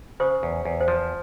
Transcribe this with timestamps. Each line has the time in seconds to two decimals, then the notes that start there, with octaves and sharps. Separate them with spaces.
0.20 C#3 C5
0.43 E2
0.65 E2
0.81 C5
0.88 F3